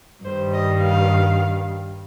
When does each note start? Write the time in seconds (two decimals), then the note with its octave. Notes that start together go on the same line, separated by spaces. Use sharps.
0.24 G2 D#3 G3 C5
0.53 D#5
0.81 F5